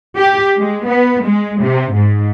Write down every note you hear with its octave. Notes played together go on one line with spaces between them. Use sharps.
G4
G#3
B3
G#3
C3
G#2